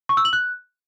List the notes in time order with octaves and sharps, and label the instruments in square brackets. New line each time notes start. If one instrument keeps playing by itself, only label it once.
[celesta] C#6
E6
F#7
F#6